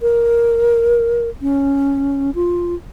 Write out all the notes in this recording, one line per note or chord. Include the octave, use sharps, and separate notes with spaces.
A#4
C#4
F4